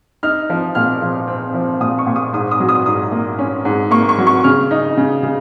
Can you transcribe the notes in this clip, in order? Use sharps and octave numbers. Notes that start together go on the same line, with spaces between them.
D#4 F6
F3
A#2 F6
F3
C4
F3
A#2 D#6
C#6
A#2
D#6
G#2 D#6
D#6
F#3
D#6
G#2 D#6
A#3
C#4
G#2
A#3 C#6
C#6
F#3
C#6
C#3 F6
D#4
C#3
C#3